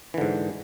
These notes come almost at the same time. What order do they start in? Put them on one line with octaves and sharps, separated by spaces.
E3 D3 G#2